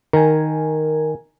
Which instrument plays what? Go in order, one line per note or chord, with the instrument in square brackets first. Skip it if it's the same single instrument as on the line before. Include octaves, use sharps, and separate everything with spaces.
[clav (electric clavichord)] D#3 [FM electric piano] A#4 G#5